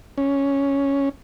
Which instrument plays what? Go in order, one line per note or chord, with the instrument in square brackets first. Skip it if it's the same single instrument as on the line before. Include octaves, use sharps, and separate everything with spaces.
[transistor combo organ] C#4